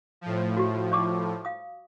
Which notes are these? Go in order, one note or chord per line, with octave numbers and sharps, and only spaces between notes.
A2 F3
F#4 G4
D5 C#6 D6
F5 D#6